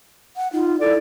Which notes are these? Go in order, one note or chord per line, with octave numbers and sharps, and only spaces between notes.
F#5
D#4 F4
E4 A4 D5